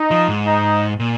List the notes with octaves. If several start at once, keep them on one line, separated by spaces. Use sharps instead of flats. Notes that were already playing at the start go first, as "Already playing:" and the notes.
Already playing: D#4
F3
G#2
D#4
A#2